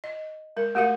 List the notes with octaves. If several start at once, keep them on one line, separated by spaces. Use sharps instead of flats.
D#5
G#3 A#4
A3 F#4 G4 A#4 F5